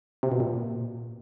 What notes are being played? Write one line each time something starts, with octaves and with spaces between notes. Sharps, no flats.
C3
B2
A#2